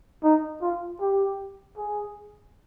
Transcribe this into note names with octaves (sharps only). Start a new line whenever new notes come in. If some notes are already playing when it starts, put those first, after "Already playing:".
D#4
F4
G4
G#4